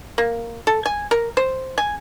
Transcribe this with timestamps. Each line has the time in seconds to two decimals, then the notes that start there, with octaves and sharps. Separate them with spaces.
0.18 A#3
0.67 A4
0.86 G#5
1.11 A#4
1.37 C5
1.78 G#5